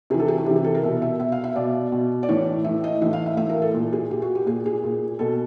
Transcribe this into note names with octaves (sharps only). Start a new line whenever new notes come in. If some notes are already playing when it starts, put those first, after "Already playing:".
C3 E3 G#4
A4
G#4
F#4
C3 E3 G4
G#4
A4
A#4
B2 E5
E5
B2 E5
F5
E5
B2 D5
B2
D5
A2 E3 C#5
A2 E3 E5
D#5
A2 E3 E5
F5
E5
A2 E3 E5
A#4
A4
A#2
G#4
A#2 G4
F#4
G4
A#2 G#4
G#4
A#2
B2 A4